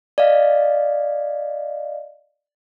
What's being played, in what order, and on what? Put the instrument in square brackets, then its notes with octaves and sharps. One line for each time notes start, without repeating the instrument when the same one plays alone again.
[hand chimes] D5 D#5 F5